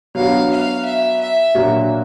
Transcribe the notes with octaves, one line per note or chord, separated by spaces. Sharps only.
F#3 B3 D4 F#4 F5
F5
E5
E5
A#2 F#3 A#3 D4 F#4